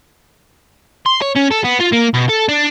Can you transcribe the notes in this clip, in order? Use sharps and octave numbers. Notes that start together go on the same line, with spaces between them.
C6
C#5
C#4
A4
B3
F4
A#3
B2
A4
D4